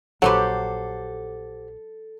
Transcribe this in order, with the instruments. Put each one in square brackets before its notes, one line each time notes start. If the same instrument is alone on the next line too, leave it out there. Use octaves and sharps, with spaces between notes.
[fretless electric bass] A#1 [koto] F#3 B4 [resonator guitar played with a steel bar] G4 C5 F#5 [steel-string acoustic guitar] A4